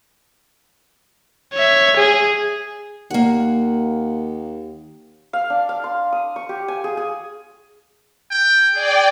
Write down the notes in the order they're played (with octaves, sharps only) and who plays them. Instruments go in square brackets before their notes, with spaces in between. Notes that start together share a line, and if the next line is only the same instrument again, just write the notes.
[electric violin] C#5 E5
G#4
[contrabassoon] D#2 [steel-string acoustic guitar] A#3 F#5
[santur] F5
D4
F5
C6
D#6
C#6
G4
G#5
G#4
G#4
[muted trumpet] G5
[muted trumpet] G#4 [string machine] D5 G5